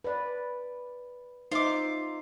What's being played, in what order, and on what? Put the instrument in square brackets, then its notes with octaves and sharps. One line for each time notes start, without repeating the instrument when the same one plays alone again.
[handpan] B4 D5
[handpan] D#4 C5 E5 [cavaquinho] F4 D6